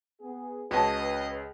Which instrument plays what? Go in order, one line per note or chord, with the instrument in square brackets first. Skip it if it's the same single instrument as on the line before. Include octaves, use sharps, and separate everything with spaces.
[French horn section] B3 G#4
[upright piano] C#2 [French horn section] C#3 B4 [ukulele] F#4 C#5 A5 [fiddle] D#5